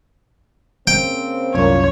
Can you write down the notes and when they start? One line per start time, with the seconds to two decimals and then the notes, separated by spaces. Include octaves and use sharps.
0.87 C#3 A#3 C4 G5
1.54 C2 F#2 A#2 C#5